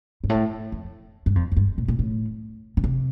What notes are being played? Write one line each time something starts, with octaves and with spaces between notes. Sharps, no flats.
G2
A2
F2
G2
F2
F2
G2
A#2
A#2
A2
D3
C3